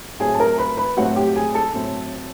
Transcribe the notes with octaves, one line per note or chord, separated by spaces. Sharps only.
A2 F#3 A3 C4 G#4 G#5
A5
A#4 A#5
B4 B5
B4 B5
A2 F#3 A3 C4 F#4 F#5
G4 G5
G#4 G#5
A4 A5
A2 F#3 A3 C4